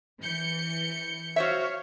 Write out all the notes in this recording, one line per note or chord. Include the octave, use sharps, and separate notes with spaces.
E3 G6 C#7
F#4 C5 C#5 E5 F5